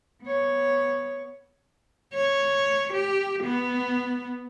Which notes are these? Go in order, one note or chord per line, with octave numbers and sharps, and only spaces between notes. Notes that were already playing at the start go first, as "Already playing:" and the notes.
B3 C#5
C#5
G4
B3